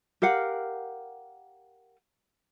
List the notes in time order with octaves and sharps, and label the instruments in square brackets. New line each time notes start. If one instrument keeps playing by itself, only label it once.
[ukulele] G4 A#4 F5 F#5